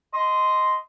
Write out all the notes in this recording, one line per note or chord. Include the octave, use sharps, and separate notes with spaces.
D#5 C6